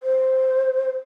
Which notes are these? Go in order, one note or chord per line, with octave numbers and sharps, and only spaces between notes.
C5